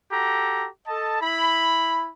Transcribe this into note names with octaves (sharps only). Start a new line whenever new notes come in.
F#4 G4 A4 A#5
A4 D#5 A5
E4 B5